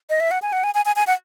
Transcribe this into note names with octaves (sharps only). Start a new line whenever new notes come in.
D#5
E5
F#5
G#5
F#5
G#5
G#5
G#5
G#5
F#5